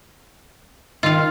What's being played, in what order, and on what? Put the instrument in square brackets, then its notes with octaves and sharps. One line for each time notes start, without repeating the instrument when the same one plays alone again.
[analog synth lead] D#3 [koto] F4 F5